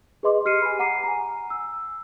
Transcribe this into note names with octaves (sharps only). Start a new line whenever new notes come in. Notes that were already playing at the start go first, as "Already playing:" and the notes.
G#4 B4 D#5 C6 D6
G4 F6 C7 C#7 D#7
G#5 B5
F#5 A#5 D6 C7 D#7
G#5 A#5
E6